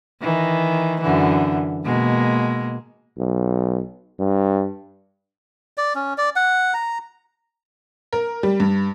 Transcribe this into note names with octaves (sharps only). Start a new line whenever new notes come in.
D#3 E3
F#2 D3 E3
B2 G#3 A#3
B1
G2
D5
C#4
D5
F#5
A#5
A#4
G3
G2